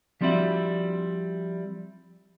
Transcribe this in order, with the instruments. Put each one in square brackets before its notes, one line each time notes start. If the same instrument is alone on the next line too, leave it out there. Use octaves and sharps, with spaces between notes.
[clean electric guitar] F3 G3 C4 D4 E4 F#4